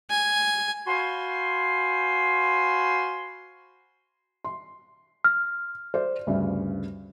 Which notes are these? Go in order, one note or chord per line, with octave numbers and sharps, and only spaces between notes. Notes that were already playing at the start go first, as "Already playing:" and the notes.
G#5
F#4 C5 F5 G#5 B5 C6
C6
F6
C5 D5
D2 G2 C#3